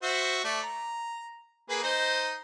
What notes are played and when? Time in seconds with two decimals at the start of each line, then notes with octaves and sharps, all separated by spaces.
0.03 F#4 C5 E5
0.44 A3 D5
0.63 A#5
1.69 A#3 G#4 B4
1.83 D#4 C5 D#5